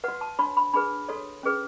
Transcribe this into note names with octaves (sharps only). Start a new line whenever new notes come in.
F#4 B4 F#5
A5
D4 F#4 C#5 B5
B5
D4 G#4 B4 B5
F#4 A4 C#5
C#4 G#4 B4